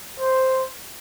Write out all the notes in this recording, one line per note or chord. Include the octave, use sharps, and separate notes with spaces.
C5